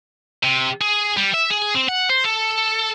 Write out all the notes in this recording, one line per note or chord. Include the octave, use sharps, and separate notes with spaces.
C3
G#4
G3
E5
G#4
C4
F#5
C5
A4